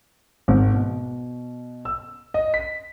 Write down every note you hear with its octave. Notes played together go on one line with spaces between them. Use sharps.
G#1
B2
E6
D#5
B6